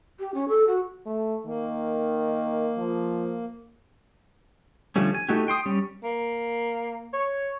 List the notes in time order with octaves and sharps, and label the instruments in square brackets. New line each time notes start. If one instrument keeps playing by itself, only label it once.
[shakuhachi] G4
C#4
A4
F#4
[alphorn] A3
[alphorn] D#3 [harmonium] A#3
[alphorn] F3
[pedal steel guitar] D3 F3 G3 A3 C#4
G#5
A3 D#4 E4 F#4 G4
G5 C6 D#6
G3 C#4
[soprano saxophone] A#3
C#5